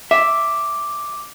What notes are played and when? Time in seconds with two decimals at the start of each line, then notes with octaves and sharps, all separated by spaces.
0.11 E5 D6